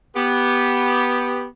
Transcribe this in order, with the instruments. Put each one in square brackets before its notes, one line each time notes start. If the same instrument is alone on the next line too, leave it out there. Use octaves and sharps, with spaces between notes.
[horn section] B3 G4